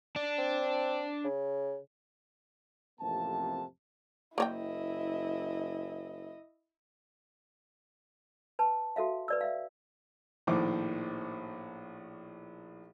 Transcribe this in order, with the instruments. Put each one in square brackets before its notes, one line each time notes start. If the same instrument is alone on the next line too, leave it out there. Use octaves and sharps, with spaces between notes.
[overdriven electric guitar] D4
[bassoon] C4
C#3
[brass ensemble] A1 F2 C3 A#3 A5
[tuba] F#1 [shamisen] A#3 C#5 G5 [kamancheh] E4 D#5
[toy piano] B4 A5
F#4 A4 E5 F5
B4 D5 E6
E5 F5
[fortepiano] A#1 A2 D#3 C5 D6